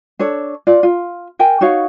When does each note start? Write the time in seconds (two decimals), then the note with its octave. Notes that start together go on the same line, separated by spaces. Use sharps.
0.19 D4 A4 C#5
0.67 F4 D5
0.83 F4
1.39 A#4 G5 G#5
1.61 D#4 F#4 C#5 F5